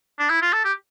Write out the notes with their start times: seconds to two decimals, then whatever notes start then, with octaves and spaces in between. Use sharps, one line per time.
0.19 D4
0.30 E4
0.42 F4
0.53 A4
0.64 G4